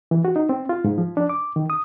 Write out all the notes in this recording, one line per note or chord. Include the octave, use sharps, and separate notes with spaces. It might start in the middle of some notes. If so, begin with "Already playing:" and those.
E3
F#4
D#4
C4
F4
G#2
F3
D4
D6
D#3
D#6